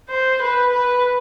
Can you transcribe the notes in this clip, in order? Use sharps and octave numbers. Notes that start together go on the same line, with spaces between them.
C5
B4
B4